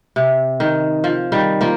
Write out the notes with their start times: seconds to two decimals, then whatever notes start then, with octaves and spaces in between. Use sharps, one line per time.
0.16 C3
0.60 D#3
1.04 F3
1.32 D#3 G3
1.61 F3 A#3